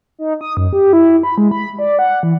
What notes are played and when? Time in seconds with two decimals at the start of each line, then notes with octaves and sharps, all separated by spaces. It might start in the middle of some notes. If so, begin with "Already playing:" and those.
0.19 D#4
0.41 D#6
0.57 F#2
0.73 G4
0.93 E4
1.23 B5
1.38 G#3
1.51 B5
1.79 D5
1.99 F#5
2.23 E3